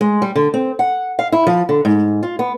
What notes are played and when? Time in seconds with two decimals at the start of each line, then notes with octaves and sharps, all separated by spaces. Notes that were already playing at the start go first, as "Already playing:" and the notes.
0.01 G#3
0.22 G3
0.36 D3
0.54 C4
0.79 F#5
1.19 F5
1.32 E4
1.47 F3
1.69 D3
1.85 G#2
2.23 F4
2.39 B3